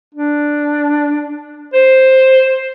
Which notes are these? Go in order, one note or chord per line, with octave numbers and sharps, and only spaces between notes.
D4
C5